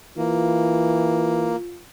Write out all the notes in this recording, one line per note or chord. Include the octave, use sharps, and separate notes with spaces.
E3 A#3 F4